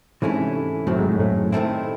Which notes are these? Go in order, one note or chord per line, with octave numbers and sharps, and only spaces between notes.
G#2 C3 E3 A3 C#4 E4
F#2 A2 D#3 F#3 C4
G#2
A2
A2
C3 D#3 A3 C4 E4